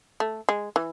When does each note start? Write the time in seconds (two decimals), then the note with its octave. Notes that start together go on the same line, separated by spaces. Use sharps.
0.20 A3
0.49 G#3
0.76 E3